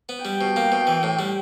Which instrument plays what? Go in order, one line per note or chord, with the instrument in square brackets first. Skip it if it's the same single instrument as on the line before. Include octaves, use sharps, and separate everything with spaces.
[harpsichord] B3
[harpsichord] G3 [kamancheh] G5
[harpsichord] B2
A#3
B2
E3
A2
G3